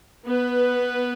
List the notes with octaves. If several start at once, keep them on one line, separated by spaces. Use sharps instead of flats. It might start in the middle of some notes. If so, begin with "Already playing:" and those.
B3 B4